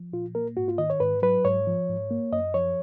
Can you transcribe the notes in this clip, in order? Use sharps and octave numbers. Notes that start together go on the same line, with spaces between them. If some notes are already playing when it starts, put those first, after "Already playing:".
Already playing: F3
A#2 F4
A#3 A#4
G#2 F#4
F4
D#3 D#5
C#5
G#2 B4
F#3 B4
G#2 C#5
F3
G#2
A#3
F#2 D#5
F3 C#5